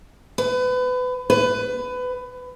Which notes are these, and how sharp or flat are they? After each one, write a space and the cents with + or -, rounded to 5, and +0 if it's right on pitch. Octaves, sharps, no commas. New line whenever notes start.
B4 +30
B4 +20